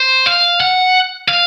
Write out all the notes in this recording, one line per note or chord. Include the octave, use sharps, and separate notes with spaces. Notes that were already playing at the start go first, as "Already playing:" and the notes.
Already playing: C5
F5
F#5
F5